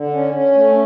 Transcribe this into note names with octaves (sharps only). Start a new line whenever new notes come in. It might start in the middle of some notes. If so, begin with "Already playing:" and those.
Already playing: D3
C#4
C#4
A3